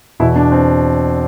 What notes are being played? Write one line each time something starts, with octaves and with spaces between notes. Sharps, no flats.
E2 B2 E4
D4
C4